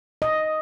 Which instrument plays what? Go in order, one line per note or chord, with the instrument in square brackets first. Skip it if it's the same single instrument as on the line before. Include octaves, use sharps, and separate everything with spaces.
[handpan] D#5